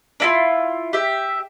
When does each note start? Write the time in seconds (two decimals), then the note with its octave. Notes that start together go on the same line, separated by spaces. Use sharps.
0.20 D4 E4 F4
0.93 G4 E5